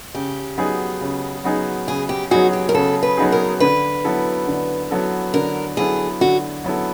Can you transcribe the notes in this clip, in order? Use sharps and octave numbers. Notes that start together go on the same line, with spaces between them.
C#3 G4
F#3 B3 D#4 G#4
C#3
F#3 B3 D#4 G#4
C#3 G#4
G4
F#3 B3 D#4 F#4 G#4
G4
A#4
C#3 A4
B4
F#3 B3 D#4 G#4
A#4
D3 B4
F#3 B3 E4 A4
D3
F#3 B3 E4 A4
D3 A#4
F#3 B3 E4 G#4 A4
D3 F#4
F#3 B3 E4 A4